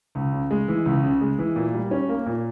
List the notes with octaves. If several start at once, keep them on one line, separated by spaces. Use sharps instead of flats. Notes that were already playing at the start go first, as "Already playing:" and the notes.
C#2
C#3
G#3
E3
C#2
C#3
G#3
E3
A#2
G3
C#4
A#3
A#2